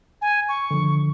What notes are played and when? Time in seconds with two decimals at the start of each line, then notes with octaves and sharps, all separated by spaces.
0.22 G#5
0.49 C#6
0.71 D3 F3